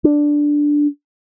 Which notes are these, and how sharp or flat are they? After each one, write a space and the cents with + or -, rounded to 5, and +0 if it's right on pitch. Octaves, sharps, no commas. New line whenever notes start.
D4 +0